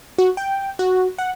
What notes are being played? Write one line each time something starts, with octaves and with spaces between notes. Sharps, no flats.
F#4
G5
F#4
F#5